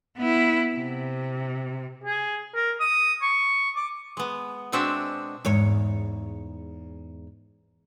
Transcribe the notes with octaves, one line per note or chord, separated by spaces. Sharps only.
B3 E4
C3
G#4
A#4
D#6
C#6
D6
G#3 B3
B2 G#3 C4 D4 F#4 E5
E2 G#2 C#5